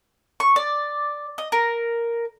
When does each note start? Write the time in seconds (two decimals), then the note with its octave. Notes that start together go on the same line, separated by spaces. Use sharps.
0.40 C#6
0.56 D5
1.38 D#5
1.52 A#4